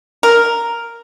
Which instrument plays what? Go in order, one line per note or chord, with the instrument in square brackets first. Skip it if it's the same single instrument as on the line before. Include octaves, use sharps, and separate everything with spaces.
[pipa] A#4